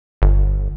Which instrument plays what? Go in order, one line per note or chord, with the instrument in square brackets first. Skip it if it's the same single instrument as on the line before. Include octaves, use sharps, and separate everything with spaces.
[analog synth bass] G1